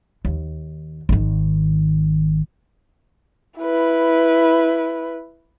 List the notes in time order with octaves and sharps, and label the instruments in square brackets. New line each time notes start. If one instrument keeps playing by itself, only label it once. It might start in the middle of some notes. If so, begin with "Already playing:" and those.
[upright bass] D#2
G#1 D#3
[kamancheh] E4 B4